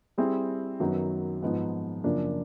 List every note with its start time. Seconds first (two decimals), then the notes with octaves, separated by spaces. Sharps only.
0.18 G3 C4 E4 G#4
0.80 F#2 D#3 F#3 B3
1.43 G#2 F3 G#3 B3 D#4
2.04 F#2 C#3 F3 A#3 D4